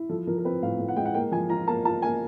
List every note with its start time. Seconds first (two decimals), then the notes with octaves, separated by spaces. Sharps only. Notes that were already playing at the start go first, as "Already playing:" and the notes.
Already playing: E4
0.09 F3 A4
0.27 F3 A#4
0.38 A#4
0.45 C4 B4
0.62 A2 F5
0.79 A2
0.88 F#5
0.96 G#3 G5
1.05 F#5
1.14 A#3 G5
1.32 F3 G#5
1.49 F4 A#5
1.67 A#3 A5
1.85 F4 A5
2.02 A#3 G#5